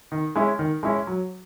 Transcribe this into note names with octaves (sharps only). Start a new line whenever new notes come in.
D#3
G#3 C#4 E4
D#3
G#3 C#4 E4
F#3